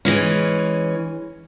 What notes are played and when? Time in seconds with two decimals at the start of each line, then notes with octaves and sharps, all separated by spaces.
0.05 E3 G#3 C#4